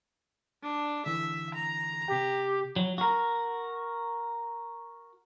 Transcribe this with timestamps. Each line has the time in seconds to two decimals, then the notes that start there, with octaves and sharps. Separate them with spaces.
0.63 D4
1.06 D3 E3 E5
1.55 A#5
2.08 C3 G4 G5
2.76 F#3
2.98 F#4 A#4